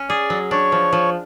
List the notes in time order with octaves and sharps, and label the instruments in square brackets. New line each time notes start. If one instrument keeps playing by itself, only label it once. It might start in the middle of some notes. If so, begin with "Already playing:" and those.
Already playing: [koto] C#4
[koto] G#4 [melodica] D5
[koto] F#3
[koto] D4 [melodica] C#5
[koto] F3
F3